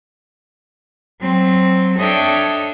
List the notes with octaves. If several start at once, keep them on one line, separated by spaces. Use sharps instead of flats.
F#3 C4
D4 A4 C#5 D#5 E5 G5